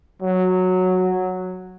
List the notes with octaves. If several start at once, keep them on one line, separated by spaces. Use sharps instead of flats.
F#3